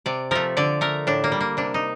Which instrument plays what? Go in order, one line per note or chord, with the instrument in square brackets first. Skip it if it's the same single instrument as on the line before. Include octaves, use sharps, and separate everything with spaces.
[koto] C3 D5
F3 A3 A#4
D3 D5
A3 A#4
A2 D4
A#3
G3
A#3
C3 D4
D#4